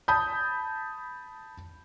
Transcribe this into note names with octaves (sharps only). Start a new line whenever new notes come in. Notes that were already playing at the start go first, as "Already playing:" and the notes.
A5 B5 D#6 G6